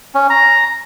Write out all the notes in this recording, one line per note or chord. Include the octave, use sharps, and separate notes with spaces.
C#4
A#5